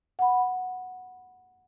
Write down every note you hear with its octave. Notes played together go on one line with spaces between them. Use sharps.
F#5 B5